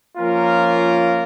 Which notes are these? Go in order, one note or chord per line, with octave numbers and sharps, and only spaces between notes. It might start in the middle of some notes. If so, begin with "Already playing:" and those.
F3 A#3 C#4 F4 A#4